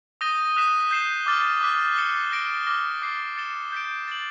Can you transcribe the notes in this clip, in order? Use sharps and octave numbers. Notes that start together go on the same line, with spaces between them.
D#6 G6 A#6 D#7 G7
D#6 F#6 B6 E7 G7
G6 C7 E7 G7
D6 F6 A6
D6 F#6 B6
A6 C#7 E7 G7
F#6 A#6 D7 G7
D6 F6 A#6
D6 F6 A6 C7
A6 C#7 E7 G7
G6 B6 D7
A6 D7 F#7